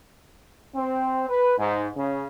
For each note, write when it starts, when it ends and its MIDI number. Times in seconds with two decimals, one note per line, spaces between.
0.73 1.26 60
1.28 1.57 71
1.57 1.88 44
1.95 2.25 49